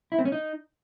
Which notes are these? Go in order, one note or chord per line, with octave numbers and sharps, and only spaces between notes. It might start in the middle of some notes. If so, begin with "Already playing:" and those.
E4
C4
C#4
D#4